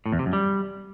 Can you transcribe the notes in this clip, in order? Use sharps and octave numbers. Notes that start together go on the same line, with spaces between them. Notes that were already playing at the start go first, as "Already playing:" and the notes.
A2
E2
C3
F#2
G3